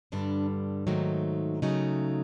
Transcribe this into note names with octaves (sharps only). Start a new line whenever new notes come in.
G2 D3 G3 D4
G#2 D#3 F#3 A3 D#4
C#3 F#3 A3 D#4